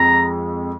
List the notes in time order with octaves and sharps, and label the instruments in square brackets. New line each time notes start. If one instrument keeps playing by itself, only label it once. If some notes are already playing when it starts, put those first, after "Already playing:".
Already playing: [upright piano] F2 G#3 [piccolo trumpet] A#5